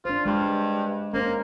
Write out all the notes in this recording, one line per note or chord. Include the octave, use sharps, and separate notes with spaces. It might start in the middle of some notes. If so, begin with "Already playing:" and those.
D4 F4 C5
G2 G#3
A#3 C#4 C5